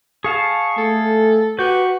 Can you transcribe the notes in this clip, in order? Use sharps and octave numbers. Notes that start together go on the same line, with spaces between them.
G#4 F5 A5 C#6
A3 A4
F#4 G4 B4 G6